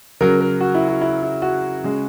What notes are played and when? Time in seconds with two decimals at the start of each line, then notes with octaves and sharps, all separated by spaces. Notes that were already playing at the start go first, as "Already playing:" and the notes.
0.21 C#3 F#3 A#4
0.41 A#4
0.60 F#4
0.75 E4
0.88 F#4
1.01 E4
1.23 E4
1.42 F#4
1.84 C#3 G#3